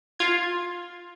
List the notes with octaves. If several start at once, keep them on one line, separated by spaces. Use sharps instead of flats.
F4 G#6